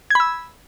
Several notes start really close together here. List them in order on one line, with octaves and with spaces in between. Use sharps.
G#6 B5 E6